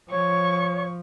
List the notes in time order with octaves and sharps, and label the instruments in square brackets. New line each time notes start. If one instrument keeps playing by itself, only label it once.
[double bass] F3 [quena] C#5 [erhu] C#6